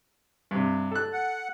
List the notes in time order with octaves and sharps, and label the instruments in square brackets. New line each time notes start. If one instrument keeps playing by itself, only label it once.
[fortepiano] G2 C3
A4 F#6
[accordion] F#5